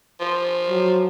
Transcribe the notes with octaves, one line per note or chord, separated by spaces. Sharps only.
F3
F#3